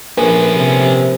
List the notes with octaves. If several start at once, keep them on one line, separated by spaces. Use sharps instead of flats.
A#1 A3 C#4 B4
C3